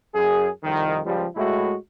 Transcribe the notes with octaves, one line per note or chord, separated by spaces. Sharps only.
F#2 G#4
C2 F2 D#3
C#2 F3 G3
A2 G#3 A3 E4 F#4